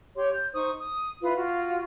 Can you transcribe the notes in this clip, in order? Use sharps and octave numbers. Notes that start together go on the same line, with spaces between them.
G4 C#5 C6
G6
D#4 C5 C#6 D#6
D#6
E4 F4 B4
F4 F#4